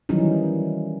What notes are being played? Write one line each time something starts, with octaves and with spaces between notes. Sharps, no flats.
D#3 E3 F#3 G3 C#4 D#4